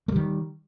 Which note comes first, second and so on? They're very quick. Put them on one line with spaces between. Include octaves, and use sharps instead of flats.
A3 G3 D#3